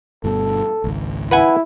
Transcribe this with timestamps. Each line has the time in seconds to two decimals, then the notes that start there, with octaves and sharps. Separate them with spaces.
0.24 G1 G2 B2 A4
0.84 G#1 C#2
1.31 E4 B4 F#5 G#5